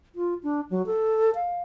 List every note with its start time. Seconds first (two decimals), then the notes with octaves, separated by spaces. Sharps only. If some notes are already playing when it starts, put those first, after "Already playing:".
0.15 F4
0.43 D4
0.70 F#3
0.86 A4
1.35 F5